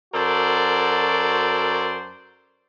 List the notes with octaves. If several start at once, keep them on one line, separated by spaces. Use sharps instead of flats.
F#2 F#4 A4 A#4 C5 D5